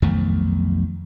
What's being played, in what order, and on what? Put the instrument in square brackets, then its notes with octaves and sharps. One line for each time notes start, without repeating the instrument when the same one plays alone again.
[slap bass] B1 F2 D#3 A3